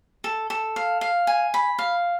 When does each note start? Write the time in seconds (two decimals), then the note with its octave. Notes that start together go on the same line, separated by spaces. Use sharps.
0.24 A4
0.50 A4
0.76 F5
1.01 F5
1.27 G#5
1.54 B5
1.79 F5